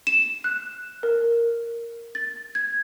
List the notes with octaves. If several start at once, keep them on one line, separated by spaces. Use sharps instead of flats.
E7
F#6
A#4
A6
G#6